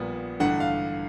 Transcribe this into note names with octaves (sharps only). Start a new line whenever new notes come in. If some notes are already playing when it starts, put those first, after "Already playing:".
Already playing: A#1 A#2 G3 B3
A1 G2 D3 F#5
F5